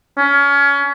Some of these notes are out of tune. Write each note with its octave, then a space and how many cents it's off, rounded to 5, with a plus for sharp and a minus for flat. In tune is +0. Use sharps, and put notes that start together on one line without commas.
C#4 +25